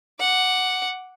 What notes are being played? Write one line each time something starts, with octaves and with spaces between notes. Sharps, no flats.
F#5 D6